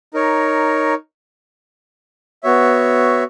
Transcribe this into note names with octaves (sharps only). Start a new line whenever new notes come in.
D#4 A#4 C#5
B3 F#4 C#5 E5